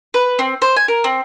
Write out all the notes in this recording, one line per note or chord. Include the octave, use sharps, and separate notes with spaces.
B4
C4
C5
G#5
A#4
C4